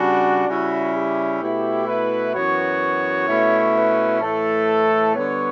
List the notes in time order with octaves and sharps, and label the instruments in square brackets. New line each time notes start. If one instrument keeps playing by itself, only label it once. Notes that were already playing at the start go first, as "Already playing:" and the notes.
Already playing: [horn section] C#3 G3 D4 [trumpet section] F#4
[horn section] C#3 G3 C#4 E4 [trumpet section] F#4
[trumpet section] G4
[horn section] B2 A3 E4
[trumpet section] B4
[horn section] F#2 E3 B3 F#4 [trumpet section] C#5
[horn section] B2 A3 C#4 E4
[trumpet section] B4
[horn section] A2 E3 A3 [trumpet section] A4
[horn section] D3 G3 B3 [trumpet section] C#5